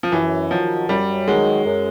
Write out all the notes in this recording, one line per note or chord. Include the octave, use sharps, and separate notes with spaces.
F3
F#2 E3
D#3 F3 F#3
F#2 G3
D#3 F#3 G#3
F#2